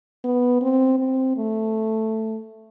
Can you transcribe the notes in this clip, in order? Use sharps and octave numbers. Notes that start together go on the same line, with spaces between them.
B3
C4
C4
A3